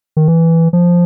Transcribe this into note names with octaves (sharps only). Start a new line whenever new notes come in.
D#3
E3
F3